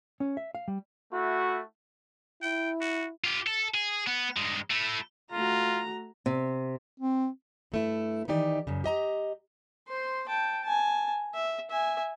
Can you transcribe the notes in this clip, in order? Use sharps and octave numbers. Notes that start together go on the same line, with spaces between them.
C#4
E5
F5
G3
A3 E4 F#4
E4 G5
F#4
F4 G4
A4
G#4
B3
G2 G#3
A3 E4
A3 F4 F#4 A#5
C3
C4
G2 A3 E4
D#3 E3 D#4 G4 D5
F#2 C#3
G4 D#5 A#5
C5 C6
G5 A5
G#5 A5
E5
E5 G#5